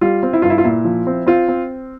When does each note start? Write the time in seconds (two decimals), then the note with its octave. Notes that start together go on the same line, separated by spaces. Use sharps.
0.01 G3 F4
0.23 C4
0.33 E4
0.42 G2 F4
0.50 E4
0.58 F4
0.64 A#2 E4
0.85 F3
1.07 C4
1.26 C4 F4
1.48 C4